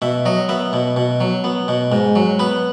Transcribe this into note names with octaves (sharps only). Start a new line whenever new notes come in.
B2 E5
F#3 D#5
B3 E5
B2
B2
F#3
B3
B2
G#2
F#3
B3 B4